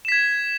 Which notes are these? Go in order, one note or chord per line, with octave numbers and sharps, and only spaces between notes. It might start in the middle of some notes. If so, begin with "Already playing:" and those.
G#6 B6 E7